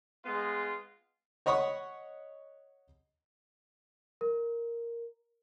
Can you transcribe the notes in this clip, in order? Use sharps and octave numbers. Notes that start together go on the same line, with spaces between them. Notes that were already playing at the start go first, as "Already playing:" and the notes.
G#3 B3 F4
C#5 D#5 F#5 B5 C#6 D#6
A#4